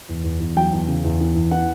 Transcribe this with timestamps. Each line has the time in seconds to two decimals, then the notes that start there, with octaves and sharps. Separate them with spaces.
0.09 E2
0.24 E2
0.40 E2
0.57 F#3 G5
0.73 E2
0.88 C#3
1.04 E2
1.20 E3
1.35 E2
1.51 E3 F#5